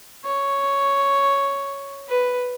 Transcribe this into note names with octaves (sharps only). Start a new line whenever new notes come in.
C#5
B4